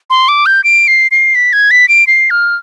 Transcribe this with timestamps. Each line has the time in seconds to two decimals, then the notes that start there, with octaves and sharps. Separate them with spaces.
0.10 C6
0.28 D6
0.46 G6
0.64 D7
0.88 C7
1.11 C7
1.35 B6
1.53 G#6
1.71 B6
1.89 D7
2.07 C7
2.30 F6